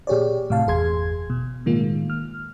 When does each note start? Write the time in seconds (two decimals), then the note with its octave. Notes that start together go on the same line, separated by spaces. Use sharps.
0.07 A#2 G4 G#4 C#5 D5
0.50 A2 C3 F5 A5
0.67 G1 E2 G#4 C6 G#6
1.30 B2
1.66 A2 D#3 G#3 A#3 F4
2.10 F6